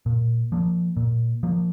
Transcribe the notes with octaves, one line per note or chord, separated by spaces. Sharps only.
A#2
F3 A#3
A#2
F3 A#3